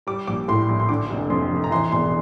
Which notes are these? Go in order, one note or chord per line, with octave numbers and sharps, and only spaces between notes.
G3 D6
A#1 D6
A2 C6
A#1
C6
D3 D6
F1
F2 C6
F1
A#5
E3 C6
E1 C6